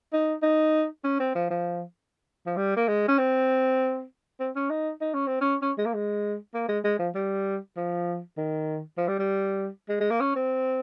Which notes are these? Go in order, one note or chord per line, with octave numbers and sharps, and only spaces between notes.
D#4
D#4
C#4
C4
F3
F3
F3
G3
A#3
G#3
C#4
C4
C4
C#4
D#4
D#4
C#4
C4
C#4
C#4
G#3
A#3
G#3
A#3
G#3
G#3
F3
G3
F3
D#3
F3
G3
G3
G#3
G#3
A#3
C#4
C4